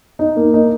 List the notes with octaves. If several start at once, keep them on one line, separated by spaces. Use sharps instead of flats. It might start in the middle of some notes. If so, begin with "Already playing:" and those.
D#4
A#3
D#4